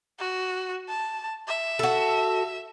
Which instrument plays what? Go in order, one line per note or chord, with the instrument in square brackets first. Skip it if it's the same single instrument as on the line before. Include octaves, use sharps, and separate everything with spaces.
[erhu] F#4
A5
E5
[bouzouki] F#4 A4